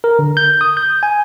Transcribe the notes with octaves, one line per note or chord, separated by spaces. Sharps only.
A#4
D3
G6
D#6
G6
G#5